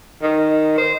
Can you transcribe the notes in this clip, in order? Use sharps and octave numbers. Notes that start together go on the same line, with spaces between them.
D#3
C5